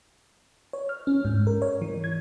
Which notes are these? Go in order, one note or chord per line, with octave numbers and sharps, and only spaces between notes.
C#5
F6
C#4
G#2
A#4
C#5
E3
G#6